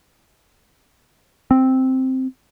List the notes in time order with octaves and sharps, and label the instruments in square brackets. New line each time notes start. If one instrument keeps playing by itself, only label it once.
[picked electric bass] C4